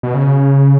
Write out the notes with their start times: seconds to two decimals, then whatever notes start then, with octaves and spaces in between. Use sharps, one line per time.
0.03 B2
0.14 C#3